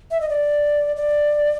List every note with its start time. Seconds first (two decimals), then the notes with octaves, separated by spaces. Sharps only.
0.11 E5
0.21 D#5
0.29 D5
0.96 D5